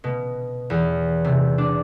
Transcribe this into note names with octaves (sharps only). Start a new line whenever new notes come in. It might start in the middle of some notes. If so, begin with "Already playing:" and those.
B2
E2
C3
D4